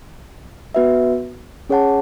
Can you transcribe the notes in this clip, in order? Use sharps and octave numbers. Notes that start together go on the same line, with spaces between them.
B3 F#4 B4 E5
C#4 G#4 C#5 F#5 A5